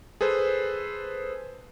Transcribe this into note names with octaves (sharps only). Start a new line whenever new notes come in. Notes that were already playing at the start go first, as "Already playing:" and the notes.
G#4 A4 B4 C5